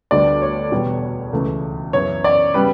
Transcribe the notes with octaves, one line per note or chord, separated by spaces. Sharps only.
D2 D3 G3 B3 D5
C#5
E2 B2 G3 B3
C#2 C#3 E3 A3
F#2 C#3 E3 B3 C#5
D5
C#3 G3 B3 B4